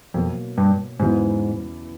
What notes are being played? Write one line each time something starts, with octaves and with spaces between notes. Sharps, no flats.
F2 B2 F#3 A#3
G2
E2 G#2 C#3 F#3 B3